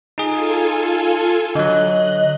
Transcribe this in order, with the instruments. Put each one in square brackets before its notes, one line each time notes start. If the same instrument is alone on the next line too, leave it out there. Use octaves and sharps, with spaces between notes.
[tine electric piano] D#4 G#4 [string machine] F4 A4 G#5
[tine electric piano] D3 F#3 [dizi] D#5 [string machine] F#6